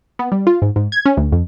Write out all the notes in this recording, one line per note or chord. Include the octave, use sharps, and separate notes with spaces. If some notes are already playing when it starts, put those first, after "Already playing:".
B3
G3
F4
G#2
G#2
G#6
C#4
D2
F2